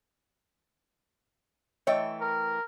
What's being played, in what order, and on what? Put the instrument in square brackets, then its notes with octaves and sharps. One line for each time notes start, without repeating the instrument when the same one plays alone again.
[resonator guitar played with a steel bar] E3 A3 G5 [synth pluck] C#5 D#5 C#6
[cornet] A#4